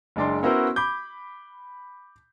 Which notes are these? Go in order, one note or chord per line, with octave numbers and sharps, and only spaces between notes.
F#1 G#3 D4 D5 C6
B3 C#4 E4 F#4 A#4 C5
B5 D6 G6